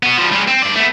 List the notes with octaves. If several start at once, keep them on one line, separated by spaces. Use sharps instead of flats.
B3 F#4
F3 G3
G3 G#3
C4
G2 D5
A3 B3